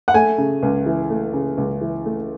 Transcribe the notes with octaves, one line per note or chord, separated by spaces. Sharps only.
F#5
A3 G#5
C#3
C#2
E3
A3
C#3
C#2
E3
A3